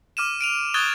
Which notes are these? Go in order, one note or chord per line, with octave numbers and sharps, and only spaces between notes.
D6 F6 D#7 E7
D7 D#7 F7
C#6 D#6 F#6 G#6 A6 G7